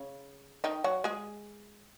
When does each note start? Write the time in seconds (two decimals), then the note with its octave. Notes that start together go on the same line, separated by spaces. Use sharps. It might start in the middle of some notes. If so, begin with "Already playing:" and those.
Already playing: C#3
0.64 D#3 D#4
0.84 F#3 F#4
1.04 G#3 G#4